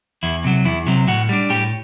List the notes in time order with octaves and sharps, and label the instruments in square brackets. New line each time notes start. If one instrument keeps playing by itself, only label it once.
[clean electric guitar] E2 E4
C3 F#3
E2 E4
C3 F#3
A2 F#4
G3 D4
A2 G4